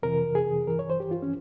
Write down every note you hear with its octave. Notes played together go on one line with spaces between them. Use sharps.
F2 C3 E3 A#4
G#4
G2 E3 A#4
C#5
C5
G4
F4
C#4